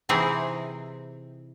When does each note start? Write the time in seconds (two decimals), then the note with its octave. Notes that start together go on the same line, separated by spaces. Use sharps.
0.09 C3 E3 C4 D#4 E4 G#4